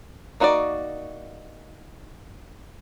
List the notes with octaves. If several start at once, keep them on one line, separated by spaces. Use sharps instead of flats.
A#3 D#4 F#4 G#4 D5